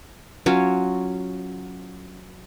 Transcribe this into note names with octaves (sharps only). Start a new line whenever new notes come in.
F#3 C#4 F4